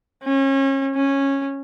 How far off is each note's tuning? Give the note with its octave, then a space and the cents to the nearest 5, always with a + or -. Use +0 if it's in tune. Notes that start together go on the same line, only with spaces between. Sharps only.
C#4 -30
C#4 -15